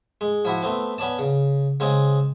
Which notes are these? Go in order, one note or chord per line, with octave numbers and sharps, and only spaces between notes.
G#3
F3 E4 F#4
A3 B3 C4
B3 C#4 D5 A5
C#3
C#3 G#3 C4 G#4